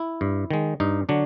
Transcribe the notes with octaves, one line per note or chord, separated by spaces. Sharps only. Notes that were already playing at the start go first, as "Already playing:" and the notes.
Already playing: E4
G2
D#3 G#3
G2 D#4
D3 F#3 D4